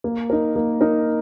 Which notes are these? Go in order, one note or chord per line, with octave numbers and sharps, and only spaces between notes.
A#3
D#4 A#4
A#3
D#4 A#4